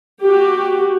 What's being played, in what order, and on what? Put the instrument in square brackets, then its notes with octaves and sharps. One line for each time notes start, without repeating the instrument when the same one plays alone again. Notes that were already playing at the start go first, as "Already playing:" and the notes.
[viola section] F#4 G4